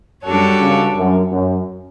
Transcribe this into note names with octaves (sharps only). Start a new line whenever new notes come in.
F#2 G3 D4 F#4 A4 C#5
C#2 C#3
F#2
F#2